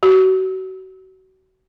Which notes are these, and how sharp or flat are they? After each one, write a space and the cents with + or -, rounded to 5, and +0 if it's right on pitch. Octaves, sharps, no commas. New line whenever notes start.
F#4 +30